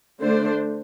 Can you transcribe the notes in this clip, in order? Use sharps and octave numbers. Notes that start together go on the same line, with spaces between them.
D3 A3 D4 C5